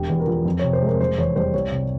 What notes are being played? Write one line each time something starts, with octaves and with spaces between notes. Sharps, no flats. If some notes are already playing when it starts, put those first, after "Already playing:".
Already playing: E1 G4
E2
A#4
F3
F2
C3 C#5
C5
G#3 A#4
F1 C5
E2 C#5
G3 C5
C2 C#5
C3